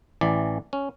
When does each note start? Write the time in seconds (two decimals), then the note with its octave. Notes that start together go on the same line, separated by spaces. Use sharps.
0.21 A1 E3 D5
0.73 C#4